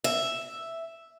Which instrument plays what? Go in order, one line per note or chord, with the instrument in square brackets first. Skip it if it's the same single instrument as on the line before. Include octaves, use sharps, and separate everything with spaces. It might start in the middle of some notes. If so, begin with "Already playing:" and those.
[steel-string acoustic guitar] E5